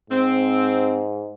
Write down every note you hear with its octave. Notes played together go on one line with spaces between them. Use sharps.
G#2 C4